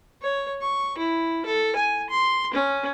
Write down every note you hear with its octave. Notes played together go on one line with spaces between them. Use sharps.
C#5
C#6
E4
A4
G#5
C6
C#4